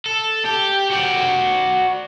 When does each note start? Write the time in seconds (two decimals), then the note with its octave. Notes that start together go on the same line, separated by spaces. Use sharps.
0.06 A4
0.46 G4
0.91 F#4 D5